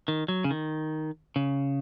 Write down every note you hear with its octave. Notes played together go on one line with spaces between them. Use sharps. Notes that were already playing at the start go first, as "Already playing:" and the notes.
D#3
F#3
C#3
D#3
C#3